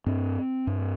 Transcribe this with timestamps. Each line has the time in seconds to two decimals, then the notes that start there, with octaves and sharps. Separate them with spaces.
0.06 G2 C4
0.67 G2